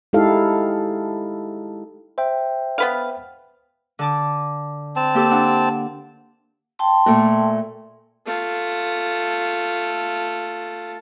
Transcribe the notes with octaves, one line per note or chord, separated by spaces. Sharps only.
G#3 D#4 E4 G4 A4 F5
C5 E5 G5
B3 B4 F5
D3 A5 D6
C4 A5
A#3 G4 A4
D4 F#5
G5 A5 C6
A#2 A3
A3 F4